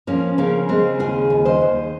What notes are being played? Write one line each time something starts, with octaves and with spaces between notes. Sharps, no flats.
F3 A#3 C#4
C#3 A#3 C#4
C#3 G#3 C4
D#2 F4 G#4
D#2
C5 D#5
D#2